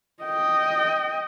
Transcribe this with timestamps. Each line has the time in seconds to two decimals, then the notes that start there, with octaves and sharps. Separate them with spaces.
0.23 D#5 G5